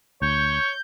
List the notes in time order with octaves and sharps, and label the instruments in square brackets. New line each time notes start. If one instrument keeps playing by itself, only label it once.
[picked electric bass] D2 [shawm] C#5 [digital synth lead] G6